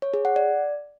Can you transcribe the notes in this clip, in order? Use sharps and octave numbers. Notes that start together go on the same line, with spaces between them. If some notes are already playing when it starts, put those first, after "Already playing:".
C#5
G#4
F#5
D5